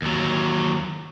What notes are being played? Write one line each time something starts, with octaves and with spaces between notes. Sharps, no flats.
D#2 F#3